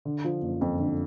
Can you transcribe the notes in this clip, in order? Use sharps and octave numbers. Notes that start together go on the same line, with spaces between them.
D3
F3
F#1
F2
D3